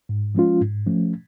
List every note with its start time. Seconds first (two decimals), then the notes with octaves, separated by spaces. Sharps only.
0.09 G#2
0.35 F3 G#3 C#4 F4
0.61 G#2
0.87 F3 A3 C#4